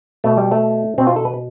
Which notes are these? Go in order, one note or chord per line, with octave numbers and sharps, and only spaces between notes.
B2 A3
G3
A3
B2 C4
F4
A4
B4